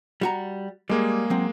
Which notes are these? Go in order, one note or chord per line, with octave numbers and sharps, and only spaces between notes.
G3 F#4 A#5
G3 G#3 A#3 G#4
F#3 C4